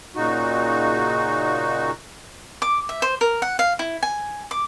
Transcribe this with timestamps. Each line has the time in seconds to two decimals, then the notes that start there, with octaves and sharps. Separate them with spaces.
0.16 A#2 C#3 D#4 F#4
2.62 D6
2.89 E5
3.02 C5
3.21 A#4
3.42 F#5
3.59 F5
3.79 E4
4.03 G#5
4.51 D6